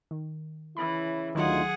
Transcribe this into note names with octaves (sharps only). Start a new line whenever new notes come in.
D#3
C#3 E3 C#4 E4 B5
D2 D#3 F#3 D#4 F4 G#4 F#5